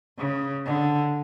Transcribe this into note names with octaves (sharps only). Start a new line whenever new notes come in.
C#3
D3